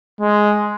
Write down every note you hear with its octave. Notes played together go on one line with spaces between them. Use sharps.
G#3